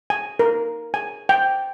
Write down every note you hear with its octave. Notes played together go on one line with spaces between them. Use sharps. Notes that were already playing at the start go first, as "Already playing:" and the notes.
G#5
A#4
G#5
G5